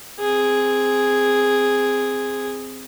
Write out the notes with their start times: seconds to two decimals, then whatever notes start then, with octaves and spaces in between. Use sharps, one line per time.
0.20 C4 G#4